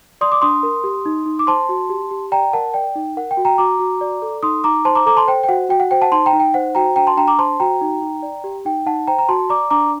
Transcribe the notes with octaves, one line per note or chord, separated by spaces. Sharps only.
D5 C6 D#6
D6
D4 C6 D#6
A#4
G4
D#4
D#4
D6
C5 A5 C6
F#4
G4
G4
D5 G5 A#5
A#4 F#5 A5
D5 G5
D#4
A#4 F#5
G5
F#4
G5 A#5
F#4 A#5 D6
F#4
D5
A4
D#4 C6 D#6
D#4 A#5 D6
C5 A5 C6
A#5 D6
A4 A#5 D6
A5 C6
C5 G5
G5
F#4 F#5
F#4 G5
F#5
C5 G5
F#5 A5
D#4 A5 C6
G5 A#5
D#4
G5
C5 F#5
F#4 G5 A#5
D4 G5 A#5
A5 C6
D4 G5 A#5
A#5 D6
C5 A5 C6
F#4 G5 A#5
D#4
D#4
D5
G4
D#4 G5
D#4 F#5 A5
C5 G5 A#5
A#5
F#4 A5 C6
D5 A#5 D6
D4 A#5 D6